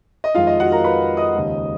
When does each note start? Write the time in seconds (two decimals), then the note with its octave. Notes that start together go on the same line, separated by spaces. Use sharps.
0.24 D#5
0.35 F2 D#3 G#3 F4 F5
0.47 D#5
0.60 F#4 F#5
0.72 A#4 A#5
0.84 B4 B5
1.17 D#5 D#6
1.34 D#2 C#3 F3 G#3